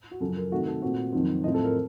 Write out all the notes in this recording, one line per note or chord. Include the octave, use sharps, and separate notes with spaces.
F#4
F#2 C#3 F3 A4
A#4
C3 D#3 A3 F#4
A4
A#2 A3 C4 F#4
F2 D#3 F#3 C4
A2 F3 C4 D#5
A4
A#4